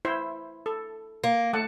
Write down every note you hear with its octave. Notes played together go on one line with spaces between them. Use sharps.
E4 C5 E5
A4
A#3
A3 F#5 A5